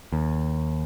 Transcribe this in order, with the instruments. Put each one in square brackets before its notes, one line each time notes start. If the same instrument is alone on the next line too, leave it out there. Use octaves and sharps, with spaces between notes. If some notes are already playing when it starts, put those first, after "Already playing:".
[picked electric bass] D#2